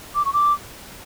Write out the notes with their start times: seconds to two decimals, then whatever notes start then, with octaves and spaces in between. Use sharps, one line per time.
0.15 D6
0.25 C#6
0.33 D6